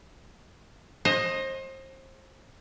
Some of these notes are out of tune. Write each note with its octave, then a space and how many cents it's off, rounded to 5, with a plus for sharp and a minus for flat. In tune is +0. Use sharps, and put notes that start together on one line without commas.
C5 +30 D#5 +0